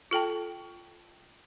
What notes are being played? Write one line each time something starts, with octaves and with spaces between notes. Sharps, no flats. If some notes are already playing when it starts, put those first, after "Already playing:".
F4 A4 G5 A5